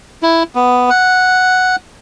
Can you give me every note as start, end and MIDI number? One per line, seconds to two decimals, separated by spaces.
0.22 0.43 64
0.55 0.90 59
0.90 1.76 78